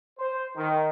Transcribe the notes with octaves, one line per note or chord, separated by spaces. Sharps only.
C5
D#3